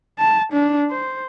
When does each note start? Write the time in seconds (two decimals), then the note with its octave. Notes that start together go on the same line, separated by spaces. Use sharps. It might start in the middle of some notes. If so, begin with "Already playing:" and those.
0.19 A5
0.53 D4
0.91 C5